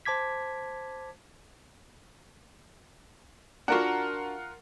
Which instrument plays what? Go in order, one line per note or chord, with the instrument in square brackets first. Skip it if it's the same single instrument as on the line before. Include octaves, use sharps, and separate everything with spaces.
[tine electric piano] C5 A5 D6 G#6 B6
[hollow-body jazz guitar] D4 F#4 [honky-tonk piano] F4 A#4 F#5